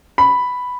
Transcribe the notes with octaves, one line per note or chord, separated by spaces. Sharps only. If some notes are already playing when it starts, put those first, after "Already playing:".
B5